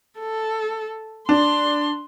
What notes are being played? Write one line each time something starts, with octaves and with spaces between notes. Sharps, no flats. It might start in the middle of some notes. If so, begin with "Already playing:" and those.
A4
D4 C6